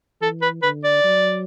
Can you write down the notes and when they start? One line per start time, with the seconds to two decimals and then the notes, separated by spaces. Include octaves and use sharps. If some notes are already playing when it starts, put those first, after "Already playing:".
0.21 E3 A4
0.42 B4
0.63 D3 B4
0.84 D5
1.04 F#3